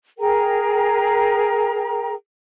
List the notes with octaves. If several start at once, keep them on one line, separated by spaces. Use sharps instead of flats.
G#4 A#4 G5 A#5